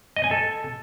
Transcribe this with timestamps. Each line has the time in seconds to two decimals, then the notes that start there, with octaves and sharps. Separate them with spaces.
0.16 D#5
0.24 G#5
0.31 A4